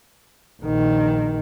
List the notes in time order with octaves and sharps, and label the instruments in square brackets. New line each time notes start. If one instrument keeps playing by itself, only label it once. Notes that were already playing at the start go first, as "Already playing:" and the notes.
[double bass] A#1 D#3